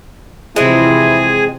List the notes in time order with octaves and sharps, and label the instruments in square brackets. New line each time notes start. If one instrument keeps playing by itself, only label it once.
[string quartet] C3 E3 F3 [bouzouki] G#3 C4 [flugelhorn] E4 [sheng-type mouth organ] G#4 G#5